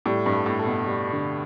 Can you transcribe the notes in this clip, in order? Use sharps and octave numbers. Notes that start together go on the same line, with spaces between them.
A2 G3
G2
A4
A2
A4
B2
G3
D3